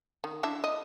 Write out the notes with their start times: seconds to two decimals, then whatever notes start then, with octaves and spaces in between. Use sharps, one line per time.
0.24 D#3
0.43 D4 E4 E5
0.64 D#5